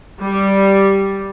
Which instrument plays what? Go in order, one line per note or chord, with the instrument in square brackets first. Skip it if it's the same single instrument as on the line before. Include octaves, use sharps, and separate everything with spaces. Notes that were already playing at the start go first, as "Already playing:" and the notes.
[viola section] G3